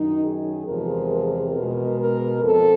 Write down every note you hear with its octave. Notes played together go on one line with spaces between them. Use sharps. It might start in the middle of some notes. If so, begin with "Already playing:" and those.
Already playing: F#2 D#3 F#3 D#4
G#4
E2 C3 F3 G#3 A#4
A#4
B2 G#3
A#4
F2 A4